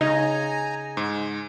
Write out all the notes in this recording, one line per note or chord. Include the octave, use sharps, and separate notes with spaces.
C#3 D#4 G#5 A#5
G#2 G#3